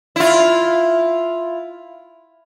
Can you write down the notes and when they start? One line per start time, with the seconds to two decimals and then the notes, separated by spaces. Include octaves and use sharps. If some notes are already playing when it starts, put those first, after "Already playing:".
0.16 E4 F4